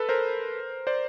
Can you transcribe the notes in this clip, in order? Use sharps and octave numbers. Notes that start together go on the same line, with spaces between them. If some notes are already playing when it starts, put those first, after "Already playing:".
Already playing: A4 B4
A#4 C5
C5 D5